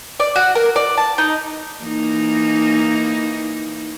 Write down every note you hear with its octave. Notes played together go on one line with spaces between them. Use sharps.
D5
F#4
A#4
D5
A5
D#4
E3 A#3 D#4